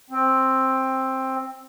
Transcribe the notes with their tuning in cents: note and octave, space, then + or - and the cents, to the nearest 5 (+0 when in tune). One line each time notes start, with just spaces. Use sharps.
C4 +10